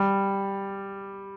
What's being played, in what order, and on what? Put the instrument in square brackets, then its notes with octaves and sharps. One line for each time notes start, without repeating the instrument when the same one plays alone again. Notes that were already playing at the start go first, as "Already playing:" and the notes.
Already playing: [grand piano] G3